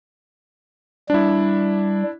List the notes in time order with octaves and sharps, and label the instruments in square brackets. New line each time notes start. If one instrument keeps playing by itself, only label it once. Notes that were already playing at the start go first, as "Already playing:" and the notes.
[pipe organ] G3 [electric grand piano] D4 E4